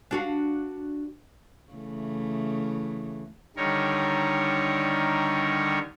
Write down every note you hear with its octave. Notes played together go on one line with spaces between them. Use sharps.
D4 F#4 F5
C#3 E3 A3
D3 D#3 G3 A#4 C#5